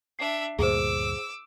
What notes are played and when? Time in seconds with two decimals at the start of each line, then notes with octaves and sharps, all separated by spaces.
0.19 D4 E5 C7
0.59 D2 G2 A#2 G#4 C5 D6 E6